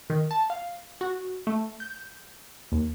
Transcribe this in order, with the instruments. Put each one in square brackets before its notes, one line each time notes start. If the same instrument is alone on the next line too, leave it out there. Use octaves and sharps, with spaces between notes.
[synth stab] D#3
A5
F5
F#4
A3
G6
D#2